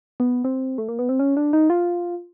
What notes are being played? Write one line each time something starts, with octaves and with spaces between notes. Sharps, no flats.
B3
C4
A3
A#3
B3
C4
C#4
D4
D#4
F4